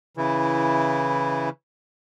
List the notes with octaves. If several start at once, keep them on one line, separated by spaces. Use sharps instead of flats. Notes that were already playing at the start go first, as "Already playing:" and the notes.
C#3 E3 E4